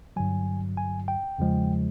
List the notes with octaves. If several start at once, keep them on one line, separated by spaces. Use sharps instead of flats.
G2 D3 F#3 G#5
G#5
G5
E2 C#3 F3 G#3